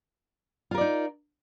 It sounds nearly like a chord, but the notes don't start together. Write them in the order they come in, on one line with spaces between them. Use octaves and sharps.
F4 A#4 D5 D#4